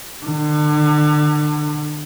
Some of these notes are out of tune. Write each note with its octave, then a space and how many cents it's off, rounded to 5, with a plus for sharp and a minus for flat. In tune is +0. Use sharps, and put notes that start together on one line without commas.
D3 +35